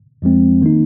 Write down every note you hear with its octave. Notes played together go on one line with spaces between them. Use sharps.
F2 F3 G#3 C4
D#3 A#3 D#4